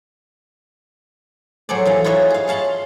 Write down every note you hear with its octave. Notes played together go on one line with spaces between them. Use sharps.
F#3 G#4 A4 C5 D5
E3 A4 F5
E4 F4 B4 C#5 D#5 E5
G#4 F5
C#5 F5 A5 B5 C6